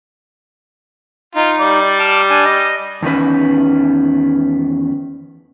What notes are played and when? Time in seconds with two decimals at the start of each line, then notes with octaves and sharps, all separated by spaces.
1.35 D#4 F4
1.60 G3 D5
1.99 A5 D6 F6
2.30 D4 G#5
2.45 D#5
3.02 E2 D#3 C#4 B4